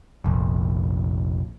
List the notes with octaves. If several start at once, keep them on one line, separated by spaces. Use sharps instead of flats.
F1 A#1